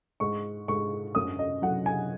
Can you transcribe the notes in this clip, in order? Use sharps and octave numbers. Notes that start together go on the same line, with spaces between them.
G#2 C#6
G#2 C#6
F#2 D#6
D#5
F#3 F#5
G#5